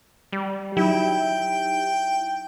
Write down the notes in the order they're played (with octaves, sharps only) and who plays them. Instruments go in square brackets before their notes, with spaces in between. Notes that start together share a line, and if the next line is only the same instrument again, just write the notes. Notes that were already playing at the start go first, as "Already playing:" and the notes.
[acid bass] G3
[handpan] F#3 [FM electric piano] D#4 G4 [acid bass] E4 [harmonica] G5